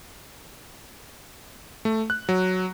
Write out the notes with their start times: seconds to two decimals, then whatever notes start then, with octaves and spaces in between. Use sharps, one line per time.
1.85 A3
2.10 F#6
2.29 F#3